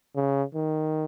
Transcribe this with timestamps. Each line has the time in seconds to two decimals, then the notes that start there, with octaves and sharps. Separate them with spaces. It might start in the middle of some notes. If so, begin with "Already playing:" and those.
0.16 C#3
0.55 D#3